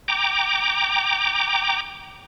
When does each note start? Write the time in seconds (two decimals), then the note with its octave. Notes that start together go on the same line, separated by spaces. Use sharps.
0.08 G5 A#5 D6